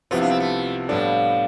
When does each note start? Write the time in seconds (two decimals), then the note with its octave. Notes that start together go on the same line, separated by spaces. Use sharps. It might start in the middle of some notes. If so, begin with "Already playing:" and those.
0.11 C2 C3 F3 B3 E4 F4
0.21 D4
0.30 C4
0.40 A3
0.89 A2 F3 G3 B3 D4 A4